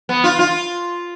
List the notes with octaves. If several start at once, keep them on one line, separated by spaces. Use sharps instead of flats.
B3
F4
F4